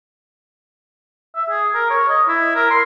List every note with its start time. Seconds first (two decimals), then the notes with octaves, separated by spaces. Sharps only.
1.35 E5
1.50 G#4
1.74 A#4
1.90 C#5
2.08 D#5
2.28 E4
2.55 A#4
2.70 C6